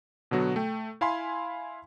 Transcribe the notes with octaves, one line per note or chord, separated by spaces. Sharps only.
B2 D3 F#3 B3 F#4
A3 G5
E4 F5 G#5 B5 C6